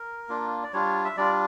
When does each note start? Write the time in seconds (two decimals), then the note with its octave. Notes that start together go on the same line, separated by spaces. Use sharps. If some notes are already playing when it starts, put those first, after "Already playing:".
Already playing: A#4
0.29 A#3 D4 F4
0.63 D5
0.73 G3 D4 F4 C#5
1.05 E5
1.17 G3 D4 F4 D5